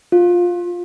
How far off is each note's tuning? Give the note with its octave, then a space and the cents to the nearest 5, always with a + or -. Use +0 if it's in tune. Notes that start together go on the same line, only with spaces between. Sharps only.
F4 +15